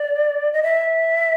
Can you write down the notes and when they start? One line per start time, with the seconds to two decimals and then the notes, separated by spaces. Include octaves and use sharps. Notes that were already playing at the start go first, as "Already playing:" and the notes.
Already playing: D5
0.53 D#5
0.63 E5